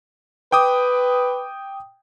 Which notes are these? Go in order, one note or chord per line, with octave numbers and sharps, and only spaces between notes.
B4 G5 D6 D#6